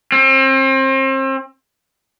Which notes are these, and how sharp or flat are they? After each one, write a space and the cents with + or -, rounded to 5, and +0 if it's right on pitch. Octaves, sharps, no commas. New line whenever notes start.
C4 +35